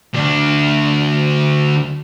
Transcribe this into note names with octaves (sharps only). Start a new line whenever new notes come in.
D2 D4